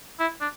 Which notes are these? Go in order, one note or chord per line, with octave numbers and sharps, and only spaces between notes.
E4
D4